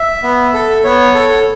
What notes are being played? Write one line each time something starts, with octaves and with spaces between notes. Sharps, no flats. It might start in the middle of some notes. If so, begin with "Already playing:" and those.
Already playing: E5
B3
A4
B3 C#5
A4